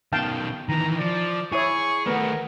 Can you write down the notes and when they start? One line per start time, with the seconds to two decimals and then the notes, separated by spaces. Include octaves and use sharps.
0.13 B2 D#3 F5 G5 A5
0.69 D#3 E3 A#5
1.00 F3 D5
1.52 E4 G#4 C#5 C#6
2.06 D#3 A3 B3 A#4